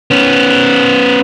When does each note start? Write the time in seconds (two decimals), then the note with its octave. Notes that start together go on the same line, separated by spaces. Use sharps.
0.11 B3 C#4